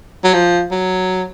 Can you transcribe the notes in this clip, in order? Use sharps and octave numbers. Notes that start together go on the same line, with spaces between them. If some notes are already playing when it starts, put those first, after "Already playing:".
F#3
F3
F#3